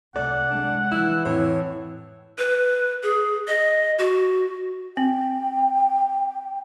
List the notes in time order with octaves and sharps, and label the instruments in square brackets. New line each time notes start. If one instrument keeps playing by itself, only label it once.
[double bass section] C2 [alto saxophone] A3 [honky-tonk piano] D5 [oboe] F#5
[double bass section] G#3 [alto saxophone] D4
[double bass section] E3 [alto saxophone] E4 [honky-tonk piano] E6
[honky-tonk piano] F2 A2 [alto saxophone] C#5
[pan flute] B4
G#4
D#5
F#4
[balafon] C4 [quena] G5